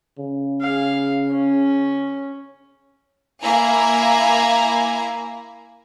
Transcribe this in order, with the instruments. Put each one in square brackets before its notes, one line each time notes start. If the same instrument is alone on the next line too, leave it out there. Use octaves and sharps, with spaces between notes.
[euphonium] C#3
[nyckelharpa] G#4 F5
C#4
[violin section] A#3 E4 G#5 A#5